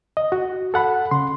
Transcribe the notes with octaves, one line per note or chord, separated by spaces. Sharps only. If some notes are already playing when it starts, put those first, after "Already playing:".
D#5
F#4
A4 F#5 B5
C#3 C6